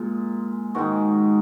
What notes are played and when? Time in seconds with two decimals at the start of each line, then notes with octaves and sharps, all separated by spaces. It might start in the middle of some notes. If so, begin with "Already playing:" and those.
Already playing: A#2 G#3
0.75 G#2 D#3 G#3 F#4